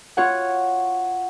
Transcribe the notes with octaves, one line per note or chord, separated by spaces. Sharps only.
F4 C#5 F#5